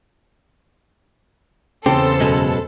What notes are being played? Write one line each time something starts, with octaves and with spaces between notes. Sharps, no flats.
E2 C#3 C4 G4 A4 C5 E6
F#2 B2 G#3